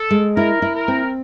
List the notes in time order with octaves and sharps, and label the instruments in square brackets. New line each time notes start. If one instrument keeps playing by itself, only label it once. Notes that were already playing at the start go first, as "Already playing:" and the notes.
Already playing: [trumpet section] A4
[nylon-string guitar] G#3
[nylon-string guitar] E4 [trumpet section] A#4
[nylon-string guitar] E4
[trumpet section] A#4
[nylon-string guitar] C4